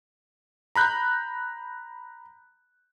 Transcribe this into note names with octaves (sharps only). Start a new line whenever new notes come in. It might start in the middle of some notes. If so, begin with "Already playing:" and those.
A#5 B5 F#6 G6